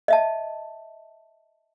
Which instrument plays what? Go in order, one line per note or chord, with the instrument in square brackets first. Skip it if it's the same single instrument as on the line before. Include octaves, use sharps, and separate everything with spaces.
[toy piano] D#5 E5 A5